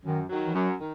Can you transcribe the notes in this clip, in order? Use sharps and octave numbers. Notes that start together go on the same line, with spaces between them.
F#2 D#3
D#3 F#3
E3
F#2 F#3
D#3